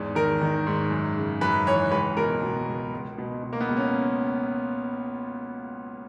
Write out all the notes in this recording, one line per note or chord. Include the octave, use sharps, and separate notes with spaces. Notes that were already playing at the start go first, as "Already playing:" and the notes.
Already playing: E2 G#2
D#3 A#4
D#3
G#2
F#2
C#3
F#2 B4
E3 C#5
C#2 B4
B2 A#4
B2
C#2
C#2
B2
B2
A#3
B3
C#2
C#4